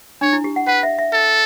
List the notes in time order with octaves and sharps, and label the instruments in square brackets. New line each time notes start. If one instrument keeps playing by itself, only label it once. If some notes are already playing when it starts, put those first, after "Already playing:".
[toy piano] D4 [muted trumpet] C#5
[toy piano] E4
G4
F#5
[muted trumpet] B4 [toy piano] F#5
[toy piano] E5
E5
[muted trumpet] A4